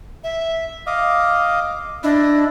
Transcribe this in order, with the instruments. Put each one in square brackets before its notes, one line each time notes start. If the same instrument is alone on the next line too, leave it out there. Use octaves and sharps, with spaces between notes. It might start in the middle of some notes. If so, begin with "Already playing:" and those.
[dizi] E5
[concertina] D#5 F5 [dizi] D6
[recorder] D4 [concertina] E4 [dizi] D#5